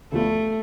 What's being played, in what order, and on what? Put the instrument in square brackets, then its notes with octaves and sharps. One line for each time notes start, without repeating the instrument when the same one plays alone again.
[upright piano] D2 D3 F3 B3 F4 [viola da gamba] A3